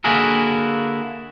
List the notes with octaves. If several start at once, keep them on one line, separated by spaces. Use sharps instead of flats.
D3 A#3 E4 F#4 G#4 A#4